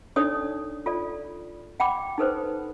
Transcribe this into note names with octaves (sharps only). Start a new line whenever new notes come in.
D4 D#4 A4 C#5 D5 D#6
F4 A4 D5
F#5 G5 B5 D6
D#4 A4 B4 C5